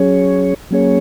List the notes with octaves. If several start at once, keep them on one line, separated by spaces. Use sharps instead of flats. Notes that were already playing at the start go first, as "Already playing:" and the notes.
Already playing: F#3 C#4 G#4 C#5
F#3 A#3 C#4 G#4 C#5